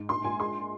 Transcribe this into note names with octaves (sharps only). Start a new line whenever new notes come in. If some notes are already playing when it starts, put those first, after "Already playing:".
Already playing: G#2
A#1 C6
A#1 G#5
G#3 C6